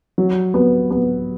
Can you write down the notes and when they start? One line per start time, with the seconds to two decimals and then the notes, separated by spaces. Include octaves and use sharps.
0.18 F#3
0.54 B3
0.90 B3